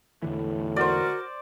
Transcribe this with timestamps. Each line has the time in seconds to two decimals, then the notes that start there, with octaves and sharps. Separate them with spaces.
0.23 E2 A2 D3 E3
0.76 F#4 A#4 C5 D5